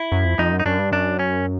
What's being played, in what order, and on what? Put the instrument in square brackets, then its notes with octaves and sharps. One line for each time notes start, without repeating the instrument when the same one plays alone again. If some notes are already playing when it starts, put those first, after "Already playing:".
Already playing: [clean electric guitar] E4
[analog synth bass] F#2
F2
[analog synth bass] F2 [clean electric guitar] D#4
[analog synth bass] F#2
[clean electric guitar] D#4
[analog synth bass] F#2 [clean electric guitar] D4
[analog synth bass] G2
[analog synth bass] F#2 [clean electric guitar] D4
[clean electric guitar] C#4